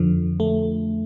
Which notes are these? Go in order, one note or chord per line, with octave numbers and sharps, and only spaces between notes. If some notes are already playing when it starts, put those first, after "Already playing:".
Already playing: F2 D3 F3
A3